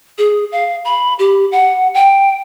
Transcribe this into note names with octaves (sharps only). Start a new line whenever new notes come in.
G#4
F5
B5
G4
F#5
G5